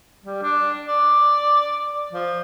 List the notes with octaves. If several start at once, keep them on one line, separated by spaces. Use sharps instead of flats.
G3
D4
D5
F3